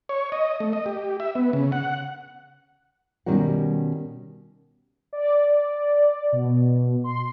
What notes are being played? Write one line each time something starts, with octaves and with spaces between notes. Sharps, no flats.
C#5
D#5
A3
D#5
G4
E5
B3
C#3
F#5
B2 D#3 G3 C#4 A#4 F#5
D5
B2
C6